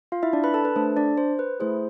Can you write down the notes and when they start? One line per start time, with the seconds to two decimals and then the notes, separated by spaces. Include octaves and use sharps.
0.12 F4 F5
0.23 E4 E5
0.33 D4 D5
0.44 B4 B5
0.54 A4 A5
0.65 B4
0.76 A3 D4 A4 C5
0.96 D4 D5
1.18 C5
1.39 B4
1.60 A3 E4 G#4 C5